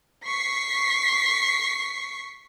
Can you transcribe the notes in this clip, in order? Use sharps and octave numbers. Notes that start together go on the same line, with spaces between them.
C#6 B6 C7